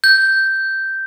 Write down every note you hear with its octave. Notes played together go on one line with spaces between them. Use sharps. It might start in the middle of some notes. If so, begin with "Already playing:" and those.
G6